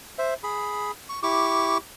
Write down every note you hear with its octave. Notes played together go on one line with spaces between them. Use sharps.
C5 E5
G#4 B5
C#6
E4 G4 C#6 D6